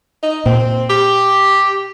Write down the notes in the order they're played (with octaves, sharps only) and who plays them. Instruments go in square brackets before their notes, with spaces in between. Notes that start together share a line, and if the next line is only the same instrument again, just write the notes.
[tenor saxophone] D#4
[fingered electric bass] A#2 [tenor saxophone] C4
[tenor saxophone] G4